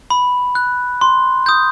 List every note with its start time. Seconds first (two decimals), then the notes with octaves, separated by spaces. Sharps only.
0.10 B5
0.55 F#6
1.01 C6
1.46 D#6 G6